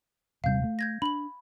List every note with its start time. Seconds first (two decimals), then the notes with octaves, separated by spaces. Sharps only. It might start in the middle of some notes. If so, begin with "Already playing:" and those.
0.44 D#1 C3 G3 F5 G6
0.64 A3
0.79 G6 G#6 A#6
1.02 D4 B5 F#7